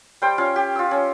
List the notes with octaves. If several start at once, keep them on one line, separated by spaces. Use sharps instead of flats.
G3 C5 G5
C#4 F4 F5
G4
F4 E6
C#4